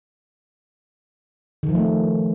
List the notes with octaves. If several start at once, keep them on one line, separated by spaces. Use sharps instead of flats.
D#3
F3
A3